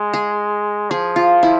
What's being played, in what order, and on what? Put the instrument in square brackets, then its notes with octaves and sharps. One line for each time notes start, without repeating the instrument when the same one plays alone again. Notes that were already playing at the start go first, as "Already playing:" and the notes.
Already playing: [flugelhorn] G#3
[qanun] G#4
[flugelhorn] F3 [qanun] G#4
[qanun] F4
E4